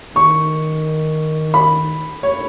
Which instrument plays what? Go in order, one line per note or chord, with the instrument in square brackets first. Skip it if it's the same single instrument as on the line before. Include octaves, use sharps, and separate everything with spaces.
[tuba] D#3 [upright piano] C#6
[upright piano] B5
C#5